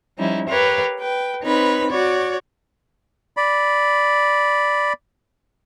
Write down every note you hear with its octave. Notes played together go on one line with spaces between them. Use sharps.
F3 G3 C#4 D#4 E4
G4 A#4 B4 C#5 F5
B4 G5
C4 D#4 B4 C#5 B5
F#4 C#5 D5
D5 B5